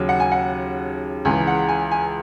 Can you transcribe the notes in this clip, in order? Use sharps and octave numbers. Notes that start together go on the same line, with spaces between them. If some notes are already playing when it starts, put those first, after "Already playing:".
Already playing: D#2 C#3 F#3
F#5
G#5
F#5
C#2 C#3 E3 G#5
F#5
G#5
G#5